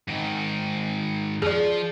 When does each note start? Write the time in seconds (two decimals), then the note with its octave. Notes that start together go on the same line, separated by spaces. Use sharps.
0.08 G#2 D#3
1.42 F3 G#4 D5